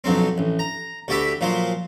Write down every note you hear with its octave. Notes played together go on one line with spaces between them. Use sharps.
B1 F2 F#3 C4
A1
A#5
D2 F#4 G4 D5 E5 B5
A#2 F3 F#3 C5